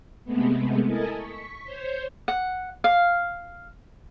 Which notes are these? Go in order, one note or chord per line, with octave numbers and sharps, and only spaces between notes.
C3 G#3 A3 B3
E4 A4 A#4 D#5 G#5 A5
C#6 B6
C5 C#5 G6
F#5
F5